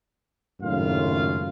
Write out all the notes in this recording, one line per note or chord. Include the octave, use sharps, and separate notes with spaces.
G#1 F#2 A2 C#3 F4 F5